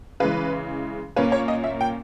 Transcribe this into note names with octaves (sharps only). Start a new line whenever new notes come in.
C#3 E3 G#3 B4
A#2 A#3 C#4 B4
C#5
D#5
E5
G5